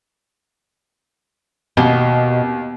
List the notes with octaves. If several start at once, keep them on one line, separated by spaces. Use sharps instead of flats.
D#2 B2